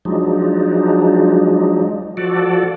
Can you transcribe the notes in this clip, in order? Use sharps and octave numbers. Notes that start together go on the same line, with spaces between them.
F3 F#3 G#3 D4 D#4
F3 F#4 A4 D5